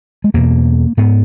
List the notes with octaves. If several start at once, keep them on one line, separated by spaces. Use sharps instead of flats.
G#3
E2 B2 A#3
G#2 B3